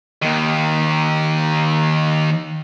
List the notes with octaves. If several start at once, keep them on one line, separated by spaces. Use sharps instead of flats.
D#2 D#3